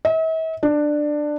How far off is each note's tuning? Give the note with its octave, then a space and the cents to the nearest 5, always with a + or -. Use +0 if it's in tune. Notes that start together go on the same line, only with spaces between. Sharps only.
E5 -45
D4 +15